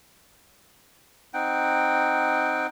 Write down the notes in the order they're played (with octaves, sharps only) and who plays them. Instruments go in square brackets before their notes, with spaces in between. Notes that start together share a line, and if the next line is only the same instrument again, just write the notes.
[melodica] C4 D#4 F#5 G5